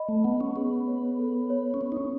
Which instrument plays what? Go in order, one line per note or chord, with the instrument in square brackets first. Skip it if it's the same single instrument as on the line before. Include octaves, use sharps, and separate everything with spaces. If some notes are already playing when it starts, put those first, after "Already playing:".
Already playing: [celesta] D#5 B5
[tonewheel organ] A3
[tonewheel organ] B3 [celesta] F#5
[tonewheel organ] C#4
[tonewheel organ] B3 [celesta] G#4
[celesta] C#5
A4
C#5
[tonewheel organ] C#4
[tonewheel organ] B3 [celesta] C#5
[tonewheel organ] D#4
C#4